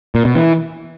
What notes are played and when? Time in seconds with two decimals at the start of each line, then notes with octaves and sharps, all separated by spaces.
0.15 A#2
0.25 B2
0.35 E3